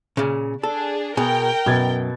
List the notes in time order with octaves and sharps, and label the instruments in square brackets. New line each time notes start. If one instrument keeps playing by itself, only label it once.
[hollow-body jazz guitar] A#2 C#3
[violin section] D4 G#4 [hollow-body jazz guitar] A4
[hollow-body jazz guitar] B2 G#4 [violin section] A#4 G5
[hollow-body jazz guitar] F#2 [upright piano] B2 G#6 A6